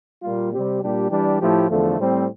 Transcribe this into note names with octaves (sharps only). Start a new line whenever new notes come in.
A#2 G3 A#3 F4
C3 G3 C4 G4
A#2 G3 D4 G4
E3 G3 D4 G4
A2 F3 A3 E4 G4
E2 D3 F3 A3
A2 G3 C4